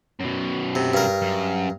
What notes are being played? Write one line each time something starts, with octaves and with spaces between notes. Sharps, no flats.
F#2 B2
C3
G2 A#4
F#2